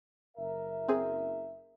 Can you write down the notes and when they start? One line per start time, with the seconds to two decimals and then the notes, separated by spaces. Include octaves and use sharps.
0.37 F#1 A#4 E5
0.88 C4 G#4